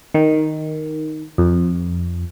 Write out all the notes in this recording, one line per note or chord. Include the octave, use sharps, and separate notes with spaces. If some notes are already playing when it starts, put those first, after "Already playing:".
D#3
F2